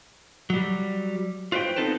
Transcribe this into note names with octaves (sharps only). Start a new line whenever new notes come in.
F#3 G3
F4 B4 C5 D5 G5
B3 C4 D#4 A4 B4 C5